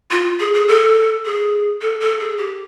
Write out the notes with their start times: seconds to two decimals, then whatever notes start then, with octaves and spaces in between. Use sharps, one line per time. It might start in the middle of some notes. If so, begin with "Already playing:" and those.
0.11 F4
0.40 G#4
0.54 G#4
0.68 A4
1.25 G#4
1.82 A4
2.00 A4
2.20 G#4
2.38 G4